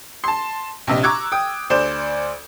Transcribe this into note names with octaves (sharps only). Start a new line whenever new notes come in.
A5 C6
A#1 C3 D#5
A#5 C#6 D6 E6 F#6 G#6
G5 D#6
D2 C5 D5 G6 E7